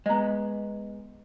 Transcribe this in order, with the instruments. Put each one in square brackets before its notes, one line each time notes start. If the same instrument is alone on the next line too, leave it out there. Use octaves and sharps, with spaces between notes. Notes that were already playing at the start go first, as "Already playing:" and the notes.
[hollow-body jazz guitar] G#3 B3 [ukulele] D#5 A#5